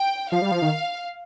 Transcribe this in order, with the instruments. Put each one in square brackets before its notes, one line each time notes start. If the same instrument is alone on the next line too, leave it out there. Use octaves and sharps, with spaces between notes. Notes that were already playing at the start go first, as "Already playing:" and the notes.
Already playing: [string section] G5
[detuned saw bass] F3 [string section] F5
[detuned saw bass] G3
F3
D#3